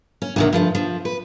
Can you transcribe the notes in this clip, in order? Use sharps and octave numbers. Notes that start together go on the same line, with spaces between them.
C#4
D2 C3 D#3
G2 F3 A3
F3
B4